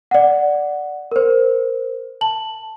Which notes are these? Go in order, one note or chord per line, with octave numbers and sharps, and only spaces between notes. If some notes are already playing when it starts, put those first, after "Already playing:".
D5 F#5
A#4 C5
A5 F#7